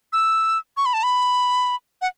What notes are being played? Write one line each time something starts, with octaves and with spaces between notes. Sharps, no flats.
E6
C#6
B5
A5
B5
F#5